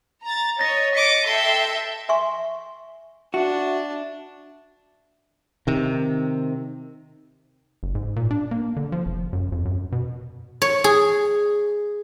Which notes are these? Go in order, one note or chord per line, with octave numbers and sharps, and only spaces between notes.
A#5 A6
C#5 D#5 A6 A#6
D#5 D6 B6 C#7
A4 E5 G5 C6
E5 G#5 C6 C#6
D4 F#4 E5
C3 D#3
F#1
G#2
A#2
D4
A#3
D3
F3
F1
F#2
F2
F#2
B2
C#5
G#4